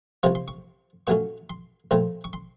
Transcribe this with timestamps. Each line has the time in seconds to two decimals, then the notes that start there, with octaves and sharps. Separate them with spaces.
0.23 C2 C3 F3 C#6
0.35 C6
0.48 C#6
1.07 A#2 F#3 A3 C#4 C#6
1.50 C6
1.91 A#1 A#2 A3 C4 A#5
2.24 C#6
2.33 C6